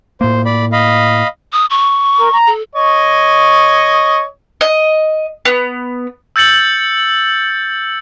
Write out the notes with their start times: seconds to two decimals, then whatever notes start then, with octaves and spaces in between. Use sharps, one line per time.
0.21 A2 A#3 C5
0.46 D5 B5
0.72 D#5 F5 B5
1.53 D#6
1.70 C#6
2.18 A#4
2.32 A#5
2.47 A4
2.75 C#5 D#5
4.61 D#5
5.45 B3
6.36 E6 G6 A6 C#7 F#7